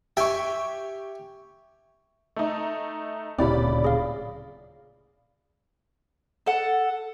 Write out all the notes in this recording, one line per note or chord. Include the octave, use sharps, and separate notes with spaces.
G4 E5 G5 G#5 C#6
A3 D#4
D1 A#2 C#3 C4 E4 G4 D5 B5
G#4 F5
A4 F#5